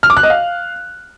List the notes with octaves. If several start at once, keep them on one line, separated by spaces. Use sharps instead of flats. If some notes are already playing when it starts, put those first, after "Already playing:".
F6
D6
F#6
D#5
F5